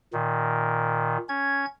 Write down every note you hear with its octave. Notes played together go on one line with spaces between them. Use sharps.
A#2 D#3
C#4 G#6